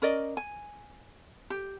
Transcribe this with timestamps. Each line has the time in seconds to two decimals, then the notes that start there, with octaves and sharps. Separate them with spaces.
0.02 C#4 A#4 D5 D#5
0.37 G#5
1.50 G4